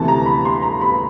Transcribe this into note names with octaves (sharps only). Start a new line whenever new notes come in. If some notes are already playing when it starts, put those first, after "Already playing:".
Already playing: D2 C3 E3 A5
A#5
B5
C6
A#5
B5